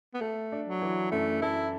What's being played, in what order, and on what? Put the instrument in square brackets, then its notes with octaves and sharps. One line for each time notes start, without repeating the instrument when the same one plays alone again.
[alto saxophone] B3
[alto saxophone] A3 [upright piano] A4
[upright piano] D4
[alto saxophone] F#3
[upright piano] E3
[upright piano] F#2 [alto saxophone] A3
[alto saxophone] E4 [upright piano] A4